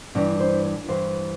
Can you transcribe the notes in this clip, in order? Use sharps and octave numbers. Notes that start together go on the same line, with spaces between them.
G2 E3 C#4
C5
C#5
G2 E3 C5